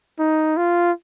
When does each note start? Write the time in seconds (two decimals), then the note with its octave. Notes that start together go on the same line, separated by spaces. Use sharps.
0.19 D#4
0.57 F4